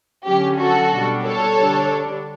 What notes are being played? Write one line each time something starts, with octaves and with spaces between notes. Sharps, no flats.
D3 F#3 C#4 G4
F#4 A4
B2 G3 D4
A4 C#5
D3 G3 D4